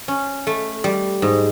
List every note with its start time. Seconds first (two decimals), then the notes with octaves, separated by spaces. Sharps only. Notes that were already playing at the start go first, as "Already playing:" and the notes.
0.08 C#4
0.47 A3
0.84 G3
1.22 G#2